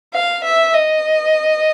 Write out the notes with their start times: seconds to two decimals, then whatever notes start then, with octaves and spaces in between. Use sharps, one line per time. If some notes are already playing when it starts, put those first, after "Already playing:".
0.14 F5
0.45 E5
0.74 D#5